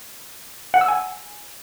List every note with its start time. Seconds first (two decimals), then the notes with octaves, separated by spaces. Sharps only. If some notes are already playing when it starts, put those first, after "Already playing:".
0.74 F#5
0.81 E6
0.88 G#5